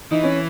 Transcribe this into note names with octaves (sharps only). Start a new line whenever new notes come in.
E3 D#4
C#4